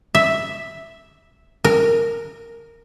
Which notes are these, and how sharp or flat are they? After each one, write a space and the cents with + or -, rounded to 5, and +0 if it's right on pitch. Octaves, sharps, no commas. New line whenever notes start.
E5 +0
A#4 -10